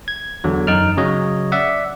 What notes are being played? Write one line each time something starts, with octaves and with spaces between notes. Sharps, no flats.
G#6
E2 D3 F#3
F#2 D#4 F6
C#3 F#3 C#5 D#5
D5 E5 F#5